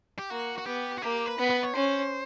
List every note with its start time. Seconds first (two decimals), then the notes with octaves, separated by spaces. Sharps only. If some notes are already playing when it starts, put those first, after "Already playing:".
0.18 G4
0.30 A#3 F#4
0.58 F#4
0.66 B3 G4
0.98 F#4
1.02 A#3 G4
1.26 B4
1.38 B3
1.50 B4
1.63 C#5
1.74 C#4 C5